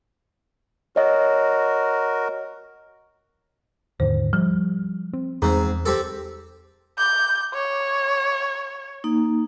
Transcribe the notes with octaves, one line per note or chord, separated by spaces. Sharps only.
F#4 A#4 C#5 D#5
D#2 G#2 D3 C5
F3 G3
C4
E2 G#2 C4 G#4 A#5
C4 G4 A4
D6 G6
C#5
A#3 D#4